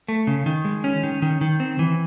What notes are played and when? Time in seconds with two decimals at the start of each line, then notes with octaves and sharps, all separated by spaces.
0.08 A3
0.27 C#3
0.46 D#3
0.65 G#3
0.84 C#4
1.03 D#3
1.22 D#3
1.41 D#3
1.60 C4
1.79 E3